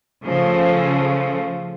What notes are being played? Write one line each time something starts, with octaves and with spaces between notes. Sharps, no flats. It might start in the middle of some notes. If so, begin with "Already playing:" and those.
C#3 F3 A3